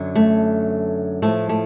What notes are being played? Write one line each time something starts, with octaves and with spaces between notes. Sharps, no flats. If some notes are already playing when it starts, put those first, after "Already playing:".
Already playing: F#2 D3 F#3
A3
A2 F3 A3
A3